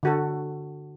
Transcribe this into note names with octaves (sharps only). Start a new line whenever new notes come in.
D3 F#4 A4